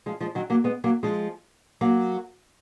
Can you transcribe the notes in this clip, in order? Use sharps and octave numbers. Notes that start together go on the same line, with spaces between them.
F3 G#3
F3 G#3
D#3 F#3
F#3 A#3
G#3 B3
F#3 A#3
F3 G#3
F#3 A#3